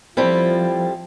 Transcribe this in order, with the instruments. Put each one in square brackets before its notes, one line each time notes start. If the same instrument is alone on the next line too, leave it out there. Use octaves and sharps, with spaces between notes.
[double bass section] F3 [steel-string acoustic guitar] G3 C4 E4 A4